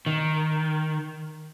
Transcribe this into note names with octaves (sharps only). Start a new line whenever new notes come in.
D#3